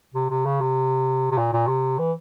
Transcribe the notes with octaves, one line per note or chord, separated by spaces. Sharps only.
C3
C3
C#3
C3
C3
A#2
A#2
C3
E3